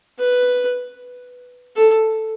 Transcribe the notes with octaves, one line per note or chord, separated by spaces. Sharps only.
B4
A4